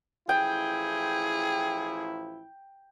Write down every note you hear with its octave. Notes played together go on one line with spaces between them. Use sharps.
A1 F3 E4 G#4 G5